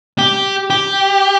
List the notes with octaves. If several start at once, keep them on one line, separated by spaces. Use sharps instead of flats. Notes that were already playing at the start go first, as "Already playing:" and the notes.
G4
G4